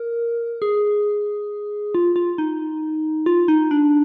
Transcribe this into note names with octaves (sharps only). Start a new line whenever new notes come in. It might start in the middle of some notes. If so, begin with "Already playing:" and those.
Already playing: A#4
G#4
F4
F4
D#4
F4
D#4
D4